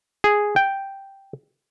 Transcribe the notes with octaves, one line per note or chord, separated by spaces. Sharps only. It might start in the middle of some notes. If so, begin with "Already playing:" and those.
G#4
G5